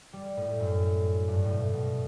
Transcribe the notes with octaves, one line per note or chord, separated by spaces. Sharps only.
G3
A2
F#2
G2
A2
B2
B2